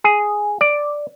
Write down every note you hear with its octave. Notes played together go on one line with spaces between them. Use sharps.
G#4
D5